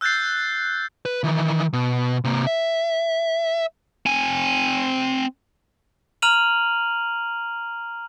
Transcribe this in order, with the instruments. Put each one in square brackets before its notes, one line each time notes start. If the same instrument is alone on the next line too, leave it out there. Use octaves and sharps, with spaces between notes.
[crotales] E6 F#6 G6 A6 C7
[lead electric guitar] B4
D#3 E3
B2
C3 A#3
E5
[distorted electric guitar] C4 G#5
[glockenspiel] A#5 F6 D#7 F7 F#7